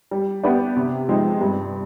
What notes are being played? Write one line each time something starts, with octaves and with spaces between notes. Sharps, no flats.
G3
B3 D4 G4 B4
C3
F3 G#3 C4 D#4
G2